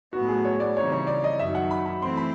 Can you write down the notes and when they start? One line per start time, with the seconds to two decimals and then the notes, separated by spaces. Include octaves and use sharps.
0.13 A2 F#3 B3 F#4
0.29 G#4
0.45 C#5
0.60 D5
0.76 C#3 E3 G3 C4 D#4 C#5
0.92 C#5
1.07 D5
1.24 D#5
1.39 F#2 D#3 F#3 E5
1.55 F#5
1.71 B5
1.86 B5
2.02 E3 A3 C4 E4 C6
2.17 B5